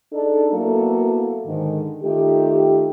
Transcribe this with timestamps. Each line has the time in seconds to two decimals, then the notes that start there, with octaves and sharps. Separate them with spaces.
0.13 D4 D#4 G#4 A4
0.53 F#3 A#3 B3 E4 F#4 A4
1.47 G#2 D3 D#3
2.03 D#3 A3 F4 G4